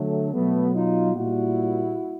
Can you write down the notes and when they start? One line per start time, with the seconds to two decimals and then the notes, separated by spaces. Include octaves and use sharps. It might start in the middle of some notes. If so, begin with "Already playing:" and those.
Already playing: D3 F#3 A3
0.34 B2 F#3 A3 B3
0.74 D#4 F4
1.15 A#2 G3 E4 F#4